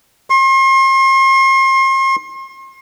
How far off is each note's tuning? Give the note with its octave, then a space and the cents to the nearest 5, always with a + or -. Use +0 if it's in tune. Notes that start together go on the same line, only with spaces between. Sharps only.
C6 +40